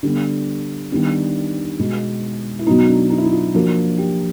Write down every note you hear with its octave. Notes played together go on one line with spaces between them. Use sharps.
D3 G3 B3 D4
D#3 G3 B3 D4
B2 G#3 B3
E4
B2 F#3 B3 D#4
D4
D#4
E4
D#4
F4
F3 A#3 D4 F#4
G4